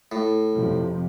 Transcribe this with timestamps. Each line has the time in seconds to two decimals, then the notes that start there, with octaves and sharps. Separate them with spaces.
0.12 A2
0.54 F2 C3 F3